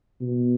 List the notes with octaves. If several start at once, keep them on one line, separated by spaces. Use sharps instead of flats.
B2